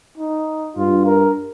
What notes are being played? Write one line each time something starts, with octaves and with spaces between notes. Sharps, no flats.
D#4
G2 F4
A#4